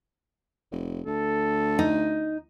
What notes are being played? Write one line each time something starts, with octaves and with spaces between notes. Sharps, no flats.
F1
D2 A4
D#4